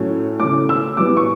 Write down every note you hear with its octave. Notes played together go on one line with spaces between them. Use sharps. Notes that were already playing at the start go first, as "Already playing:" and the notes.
Already playing: A2 F#3 A3 C#4
C#3 E3 A3 D6
E6
A2 E3 G3 B3 D6
C#6